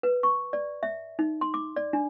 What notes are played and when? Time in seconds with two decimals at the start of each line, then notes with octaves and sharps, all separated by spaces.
0.03 B4
0.23 C#6
0.53 D5
0.83 E5
1.19 D#4
1.41 C6
1.54 D6
1.76 D5
1.93 D4